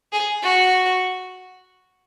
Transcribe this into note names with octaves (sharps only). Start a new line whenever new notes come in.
G#4
F#4